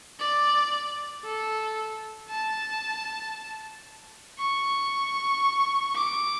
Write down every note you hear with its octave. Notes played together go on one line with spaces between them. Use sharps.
D5
A4
A5
C#6
D6